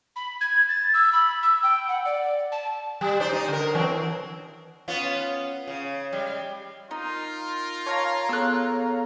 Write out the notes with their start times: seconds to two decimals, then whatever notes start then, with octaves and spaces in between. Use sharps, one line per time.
0.16 B5
0.41 G#6
0.69 A6
0.93 E6
1.13 B5
1.42 E6
1.63 G5
1.88 F#5
2.05 D5
2.52 A5
3.01 G3
3.20 D#4 C5 D5
3.32 D#4 D#5
3.48 D3 A#4
3.75 E3 F#3 C4
4.88 B3 C#4 F4
5.68 C#3
6.13 G3 G#3
6.91 D#4 F4 A#4
7.86 C#5 F5 A5 A#5
8.29 B3 G#4 A4 E6 F#6